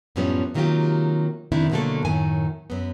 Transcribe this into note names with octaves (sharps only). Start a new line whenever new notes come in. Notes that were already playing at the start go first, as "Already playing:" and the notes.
F#2 A2 F3 G3 B3 C#4
C3 D#3 F#3 A#3 F4 G4
F2 C3 D#3 C4 D4 E4
B2 D3 F#3 A3 A#3 A4
F#2 A2 D#3 G#5
F#2 B3